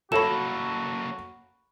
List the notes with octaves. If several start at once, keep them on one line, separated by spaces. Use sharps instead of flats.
F#3 A#3 F#4 A4 C#5 B5 E7